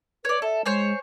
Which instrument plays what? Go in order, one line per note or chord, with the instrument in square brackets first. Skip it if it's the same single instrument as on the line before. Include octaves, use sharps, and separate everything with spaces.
[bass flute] B4 [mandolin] C#5 D5
[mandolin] A4 [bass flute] E5
[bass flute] G#3 [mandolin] C5 C#5 G#5